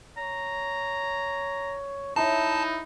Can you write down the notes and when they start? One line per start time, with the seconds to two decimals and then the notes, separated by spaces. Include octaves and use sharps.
0.17 C#5 A#5
2.16 D#4 E4 C#5 E5 A5 A#5